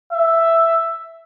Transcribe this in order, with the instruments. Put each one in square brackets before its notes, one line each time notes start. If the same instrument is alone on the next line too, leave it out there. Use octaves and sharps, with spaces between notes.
[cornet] E5